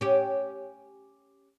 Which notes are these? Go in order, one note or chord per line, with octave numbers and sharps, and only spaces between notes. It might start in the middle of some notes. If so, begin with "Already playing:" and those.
C#4 G4